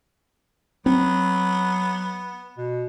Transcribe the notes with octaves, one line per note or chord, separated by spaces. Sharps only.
F#3 B3 C4
B2